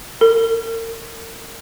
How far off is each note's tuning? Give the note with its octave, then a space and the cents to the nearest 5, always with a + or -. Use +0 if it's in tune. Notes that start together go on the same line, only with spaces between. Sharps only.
A#4 -40